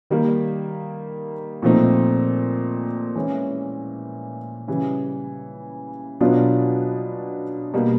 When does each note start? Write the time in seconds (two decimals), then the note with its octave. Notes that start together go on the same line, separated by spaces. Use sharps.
0.10 D#3 G3 A#3
1.62 A#2 F3 A3 C4 D#4
3.15 E3 G#3 C#4 E4
4.68 C#3 E3 G3
6.20 B2 F#3 B3 D4 F4
7.73 B2 G3 A#3